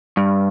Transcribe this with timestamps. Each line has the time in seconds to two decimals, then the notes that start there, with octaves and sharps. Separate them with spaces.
0.17 G2